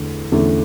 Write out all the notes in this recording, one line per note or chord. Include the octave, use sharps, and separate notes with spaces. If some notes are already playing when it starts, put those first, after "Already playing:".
Already playing: E2 D3 A3
E2 D3 A3 C#4